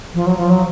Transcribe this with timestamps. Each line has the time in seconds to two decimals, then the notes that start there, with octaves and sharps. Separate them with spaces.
0.14 F3
0.27 F#3
0.37 F3
0.50 F#3